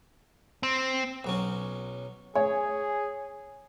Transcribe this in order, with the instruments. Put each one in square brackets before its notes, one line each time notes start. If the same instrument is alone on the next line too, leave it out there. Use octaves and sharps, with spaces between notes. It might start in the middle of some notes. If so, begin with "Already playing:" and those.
[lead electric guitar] C4
[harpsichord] B1 F#3 C#4
[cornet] G#4 [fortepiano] C#5 [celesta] G#5